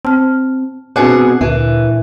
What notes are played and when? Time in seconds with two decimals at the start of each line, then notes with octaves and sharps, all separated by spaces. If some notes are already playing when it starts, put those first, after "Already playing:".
0.05 C4 A5 F6
0.96 B2 C4 D4 G#4 F#5
1.41 D2 A#2 E3